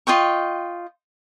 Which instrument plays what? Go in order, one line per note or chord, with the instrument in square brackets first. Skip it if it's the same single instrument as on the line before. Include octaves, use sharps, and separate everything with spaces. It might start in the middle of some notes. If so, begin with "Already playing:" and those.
[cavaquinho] F4 D#5 G5 C#6